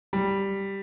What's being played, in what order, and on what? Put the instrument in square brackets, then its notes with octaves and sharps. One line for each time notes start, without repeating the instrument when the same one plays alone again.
[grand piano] G3